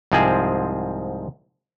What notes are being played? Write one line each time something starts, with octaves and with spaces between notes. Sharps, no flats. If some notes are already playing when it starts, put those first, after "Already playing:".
C2 G#2 F3 G#3 C4 G#4